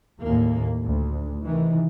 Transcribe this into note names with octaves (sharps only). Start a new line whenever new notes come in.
D#2 A2 A#3
D2
C3 D#3 E3